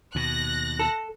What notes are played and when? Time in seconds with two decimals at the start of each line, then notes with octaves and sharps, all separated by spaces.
0.15 D#2 B2 F#6 A#6
0.79 A4